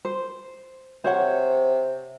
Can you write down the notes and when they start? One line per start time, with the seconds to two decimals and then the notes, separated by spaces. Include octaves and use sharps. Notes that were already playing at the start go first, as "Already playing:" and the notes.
0.05 C5
1.04 C3 C5 C#5 F#5